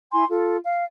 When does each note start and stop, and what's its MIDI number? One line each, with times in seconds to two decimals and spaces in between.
0.13 0.25 64
0.13 0.25 80
0.13 0.25 84
0.30 0.57 65
0.30 0.57 69
0.65 0.84 77